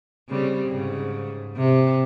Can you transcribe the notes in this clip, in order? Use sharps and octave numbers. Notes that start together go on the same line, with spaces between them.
C#3 G3 C4
G#2 C#3
C3